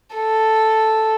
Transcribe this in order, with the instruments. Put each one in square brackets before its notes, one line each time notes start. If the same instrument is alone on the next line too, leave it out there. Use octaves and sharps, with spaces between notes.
[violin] A4